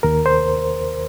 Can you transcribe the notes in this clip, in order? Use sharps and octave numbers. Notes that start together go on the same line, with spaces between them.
D#2 A#4
C5